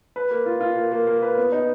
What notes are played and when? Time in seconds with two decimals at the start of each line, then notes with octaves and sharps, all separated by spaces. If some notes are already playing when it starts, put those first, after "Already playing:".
0.16 B4
0.31 A#3
0.46 F4
0.61 F4
0.76 A#3
0.92 A#3
1.07 A#3
1.22 B4
1.37 B3
1.52 D#4